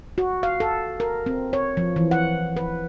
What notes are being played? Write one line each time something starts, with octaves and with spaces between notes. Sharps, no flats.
F#4
F5
A4
A#4
C4
C#5
F3
E3
F#5
B4